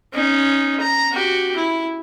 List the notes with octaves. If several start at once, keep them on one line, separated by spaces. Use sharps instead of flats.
C#4 D#4
A#5
F#4 G4
E4